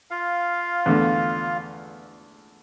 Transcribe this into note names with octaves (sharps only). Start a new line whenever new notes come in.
F4 F5
E2 D3 A3